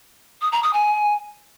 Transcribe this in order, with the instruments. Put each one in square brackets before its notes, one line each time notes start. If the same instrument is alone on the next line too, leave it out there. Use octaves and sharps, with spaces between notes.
[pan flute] D#6
A#5
D#6
G#5